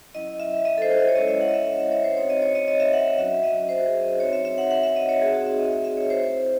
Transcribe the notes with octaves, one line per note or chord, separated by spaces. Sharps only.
F#3 C#4 E4 D#5
E5
D#5
A4
C5
D#5
C#5
G#3 C#4 E4 D#5
E5
F#5
D#5
E5
F#5
E5
C#5
C5
C4 D#4 F#4 C#5
D#5
C#5
D#5
D#5
E5
F#5
E5
F#3 C#4 F#4 E5
D#5
C5
F#4
G#4
D#5
C4 D#4 F#4 C#5
E5
E5
F#5
F#5
E5
D#5
C#5
A3 C4 D#4 F#4 G#4
F#4
E5
D#5
E5
E5
C#5
C5
C4 E4